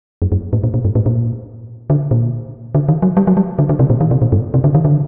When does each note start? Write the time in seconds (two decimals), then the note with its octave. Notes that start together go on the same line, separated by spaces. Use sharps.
0.22 F#2
0.32 F#2
0.53 A2
0.64 A#2
0.74 A#2
0.85 G2
0.95 A2
1.06 A#2
1.90 D3
2.11 A#2
2.75 D3
2.89 D#3
3.02 F#3
3.17 G3
3.27 F#3
3.37 G3
3.59 D3
3.69 D3
3.79 C3
3.90 A#2
4.01 D#3
4.11 C3
4.22 A#2
4.32 G2
4.54 C3
4.64 D3
4.75 D#3
4.85 D3